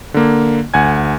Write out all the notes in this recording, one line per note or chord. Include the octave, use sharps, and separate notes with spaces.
D3 A#3
D2 F#5 G#5 G#6